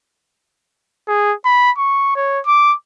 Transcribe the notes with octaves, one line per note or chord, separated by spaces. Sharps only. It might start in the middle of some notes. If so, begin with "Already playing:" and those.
G#4
B5
C#6
C#5
D6